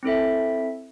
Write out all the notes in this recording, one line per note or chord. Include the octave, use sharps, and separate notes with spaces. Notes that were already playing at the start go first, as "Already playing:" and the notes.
C4 E4 A4 E5